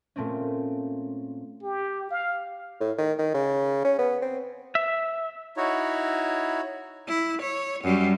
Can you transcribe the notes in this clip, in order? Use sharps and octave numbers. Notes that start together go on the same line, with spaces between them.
A#2 A3 C4 C#4
G4
F5
A2
D#3
D#3
C#3
C#4
B3
C4
E5
D#4 E4 F#4 C#5
E4
C#5
F#2 G3